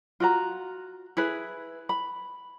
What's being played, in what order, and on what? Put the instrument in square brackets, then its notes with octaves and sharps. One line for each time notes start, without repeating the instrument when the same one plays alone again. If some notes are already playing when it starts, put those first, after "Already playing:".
[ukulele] F4 F#4 A#5
E4 G#4 B4
B5